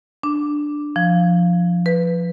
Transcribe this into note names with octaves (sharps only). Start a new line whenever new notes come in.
D4
F3
B4